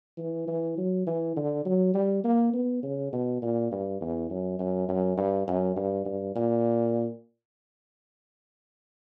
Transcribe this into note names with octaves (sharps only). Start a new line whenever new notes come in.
E3
E3
F#3
E3
D3
F#3
G3
A#3
B3
C#3
B2
A#2
G2
E2
F#2
F#2
F#2
G2
F#2
G2
G2
A#2